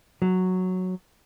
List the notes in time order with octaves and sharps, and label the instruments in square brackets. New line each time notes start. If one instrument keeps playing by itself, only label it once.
[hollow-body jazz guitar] F#3